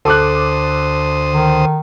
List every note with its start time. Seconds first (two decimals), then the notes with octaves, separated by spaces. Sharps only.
0.05 D2 A4 C5 D6 D#6 F#6
1.33 D#3